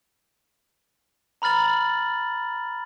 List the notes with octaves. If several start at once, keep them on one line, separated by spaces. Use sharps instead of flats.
A#5 B5 F6 A6 F#7